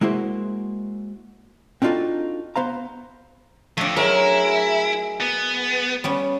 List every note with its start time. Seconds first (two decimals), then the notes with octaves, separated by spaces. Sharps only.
0.01 G#3 A#3 E4 F#4 C5
1.82 C4 D4 D#4 F4 F#4 A4
2.56 B3 C5 F5 A#5
3.77 F2 A3 D4
3.96 F#3 G#3 E4 A#4
5.21 B3
6.04 G3 B3 C#4